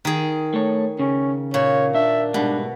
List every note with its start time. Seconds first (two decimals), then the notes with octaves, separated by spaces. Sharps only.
0.05 D#3 G#4
0.54 A3 C#5
0.99 C#3 C#4
1.54 A#2 C#5
1.94 D4 E5
2.34 G#2 B2 G3 D4